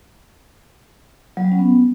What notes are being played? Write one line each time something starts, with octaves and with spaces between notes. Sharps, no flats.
F#3
G3
C#4
B3